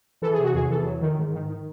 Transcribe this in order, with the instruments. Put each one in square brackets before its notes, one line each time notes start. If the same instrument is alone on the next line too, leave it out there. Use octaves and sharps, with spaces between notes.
[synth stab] E3 A4
G#4
C3
F#4
E2 G#4
E3 A4
F#3
D#3
G#2
D#3
D#3